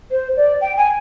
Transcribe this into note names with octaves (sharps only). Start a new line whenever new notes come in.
C5
D5
G5
G#5